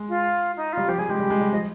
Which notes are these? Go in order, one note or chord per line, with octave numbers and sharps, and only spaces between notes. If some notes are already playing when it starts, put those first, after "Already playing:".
Already playing: G#3
F4
D#4
F4
G3
F3 G4
G3 G#4
G#3 G4
G3
G#3
G3
F3 D#5